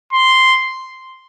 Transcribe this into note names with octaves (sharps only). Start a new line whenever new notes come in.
C6